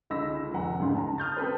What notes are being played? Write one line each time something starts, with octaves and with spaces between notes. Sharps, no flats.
C#2 D3 D#4 B5 E6 A#6
F1 F#5 A#5
D2 G#2 C#3 C6
A5 A#5
D#6 F6 G6 A6
C4 A4 B4 C5